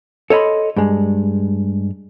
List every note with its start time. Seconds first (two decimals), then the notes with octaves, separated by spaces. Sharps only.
0.30 A4 C#5 D#5 B5 C6
0.76 G2 G#3